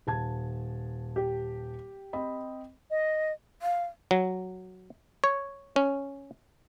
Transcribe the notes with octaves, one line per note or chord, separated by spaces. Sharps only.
D#1 A5 G#6
G4
C4 D#5 B5
D#5
F5
F#3
C#5
C#4